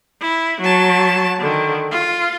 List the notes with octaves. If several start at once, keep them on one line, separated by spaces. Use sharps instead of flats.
E4
F#3 A5
D3 D#3
F4